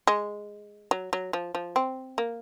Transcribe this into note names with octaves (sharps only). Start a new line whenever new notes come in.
G#3
F#3
F#3
F3
F3
C4
A#3